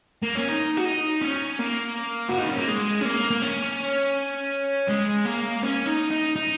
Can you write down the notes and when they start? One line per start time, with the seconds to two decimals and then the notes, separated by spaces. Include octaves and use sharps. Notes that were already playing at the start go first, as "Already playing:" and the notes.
0.23 A#3
0.36 C#4
0.48 D#4
0.77 F#4
0.86 D#4
1.21 C#4
1.59 A#3
2.29 F#4
2.39 D#4
2.49 C#4
2.59 A#3
2.69 G#3
3.01 C#4
3.05 A#3
3.31 A#3
3.42 C#4
4.88 G#3
5.25 A#3
5.63 C#4
5.86 D#4
6.10 D#4
6.36 D#4